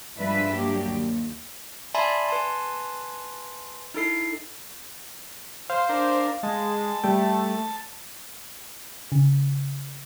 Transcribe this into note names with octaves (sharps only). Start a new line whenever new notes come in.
G2 F3 G#3 D4 B4 E5
F#3 A#3 D4 G4
D#2
D5 E5 G#5 A5 B5 C6
B4 G#5 A5 C6
D#4 E4 A4 C7
C5 F5
D4 A#4
G#3 A5
G3 A3 G5
C#3